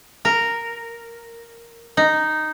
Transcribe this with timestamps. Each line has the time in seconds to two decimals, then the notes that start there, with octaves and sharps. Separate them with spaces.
0.25 A#4
1.97 D#4